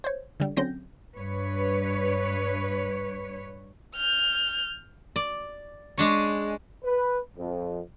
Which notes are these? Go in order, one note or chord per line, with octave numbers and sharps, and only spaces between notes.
C5 C#5
D3 G3
D3 F#3 C4 C#4 G6 A#6
G2 B4 C#5
F6 G6
D5
G#3 D4 C#5
B4
F2